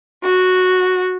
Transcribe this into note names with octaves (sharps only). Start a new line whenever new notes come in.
F#4